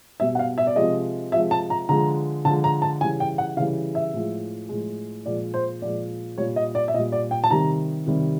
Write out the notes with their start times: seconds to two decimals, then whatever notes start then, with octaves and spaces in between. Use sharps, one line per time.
0.20 B2 G3 E5
0.35 F#5
0.39 F5
0.58 E5
0.67 D5
0.76 C3 F3 G#3 D#5
1.32 C3 F3 G#3 E5
1.51 A5
1.70 A#5
1.89 D3 F3 G#3 A#5
2.45 D3 F3 G#3 A5
2.64 A#5
2.82 A5
3.01 C#3 E3 G3 G#5
3.20 G5
3.38 F#5
3.57 C#3 F5
3.60 E3 G3
3.95 E5
4.14 A2 F3 G#3
4.69 A2 F3 G#3
5.26 A#2 F3 G#3 D5
5.54 C5
5.82 A#2 F3 G#3 D5
6.38 A#2 G3 C#5
6.56 D#5
6.75 D5
6.88 E5
6.94 A#2 G3 D#5
7.12 D5
7.31 G5
7.44 A5
7.50 C3 D#3 G3 A#5
8.07 C3 D#3 G3